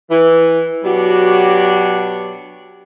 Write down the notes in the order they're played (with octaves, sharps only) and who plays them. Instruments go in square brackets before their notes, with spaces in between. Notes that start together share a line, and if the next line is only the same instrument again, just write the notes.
[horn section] E3
B2 F#3 D4 F#4 G4